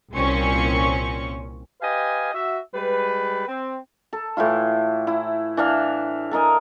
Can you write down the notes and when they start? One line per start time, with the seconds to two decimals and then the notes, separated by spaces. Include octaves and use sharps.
0.13 C2 A#2 C4 C#4 C#6
1.82 G4 B4 D#5 F5 G#5
2.33 F#4 E5
2.74 G3 G#3 B4
3.48 C4
4.13 A4
4.37 A2 E3 E4 F4
5.07 E4
5.57 E3 D4 E5 F5
6.31 A4 A#4 D#5 G#5